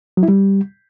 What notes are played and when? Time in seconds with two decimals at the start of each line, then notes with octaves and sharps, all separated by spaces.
0.17 F#3
0.23 E4
0.28 G3